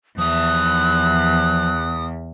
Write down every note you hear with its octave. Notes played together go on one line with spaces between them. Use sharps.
E2 F3 E5 D#6 F#6